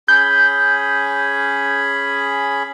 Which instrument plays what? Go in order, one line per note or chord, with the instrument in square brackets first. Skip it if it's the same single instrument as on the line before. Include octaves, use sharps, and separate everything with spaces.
[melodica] C#4 G#4 B5 [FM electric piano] G6